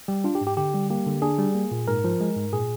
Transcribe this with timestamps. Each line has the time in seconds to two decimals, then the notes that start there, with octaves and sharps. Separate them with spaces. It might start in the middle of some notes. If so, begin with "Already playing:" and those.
0.08 G3 G4
0.24 D4 F4
0.35 G4
0.41 G#2
0.47 G4
0.57 D3 G4
0.74 G3
0.90 A#3 G4
1.06 D3
1.22 D4 G#4
1.38 G3
1.54 A#3
1.71 A#2
1.88 G#2 A#4
2.04 F3
2.21 G#3
2.37 G#2
2.53 A#2 G#4